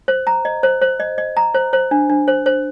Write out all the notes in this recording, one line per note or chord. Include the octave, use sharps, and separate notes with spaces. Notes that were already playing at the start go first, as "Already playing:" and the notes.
C5
A#5
D#5
C5
C5
D#5
D#5
A#5
C5
C5
D4
D4
C5
C5